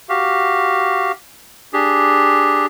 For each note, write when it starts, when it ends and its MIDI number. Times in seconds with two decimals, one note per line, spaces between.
0.09 1.12 66
0.09 1.12 67
0.09 1.12 77
1.73 2.66 62
1.73 2.66 67
1.73 2.66 68